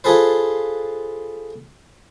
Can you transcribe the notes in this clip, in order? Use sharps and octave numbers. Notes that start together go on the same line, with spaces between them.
F4 G#4 A4 B4 C5